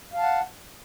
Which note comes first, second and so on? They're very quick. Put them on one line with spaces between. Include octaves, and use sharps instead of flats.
F5 A5 F#5